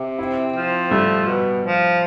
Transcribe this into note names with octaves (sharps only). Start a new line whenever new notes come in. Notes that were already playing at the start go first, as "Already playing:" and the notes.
Already playing: C3
C4 E4
F3
G3 A3
B2
F3